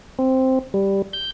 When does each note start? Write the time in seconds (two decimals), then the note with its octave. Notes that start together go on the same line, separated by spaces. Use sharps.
0.19 C4
0.74 G3
1.13 G6